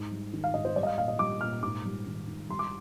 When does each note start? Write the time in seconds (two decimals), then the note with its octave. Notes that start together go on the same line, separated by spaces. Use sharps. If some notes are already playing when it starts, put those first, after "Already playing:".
Already playing: G#2
0.12 G3
0.33 D#3
0.44 F5
0.54 G#2 D#5
0.65 C5
0.76 G3 D5
0.83 D#5
0.87 F5
0.98 A#2 F5
1.08 D#5
1.19 G3 D6
1.41 A#2 F6
1.63 G#2 D6
1.85 G3
2.07 D#3
2.28 G#2
2.49 G3 C6
2.59 D6